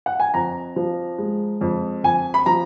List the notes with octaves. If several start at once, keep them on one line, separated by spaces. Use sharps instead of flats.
F#5
G#5
F2 A#5
F3
G#3
F2
F2 G#5
B5
F3 A#5